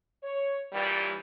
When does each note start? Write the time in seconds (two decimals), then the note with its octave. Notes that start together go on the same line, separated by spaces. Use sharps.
0.23 C#5
0.73 G2 A#2 E3 G3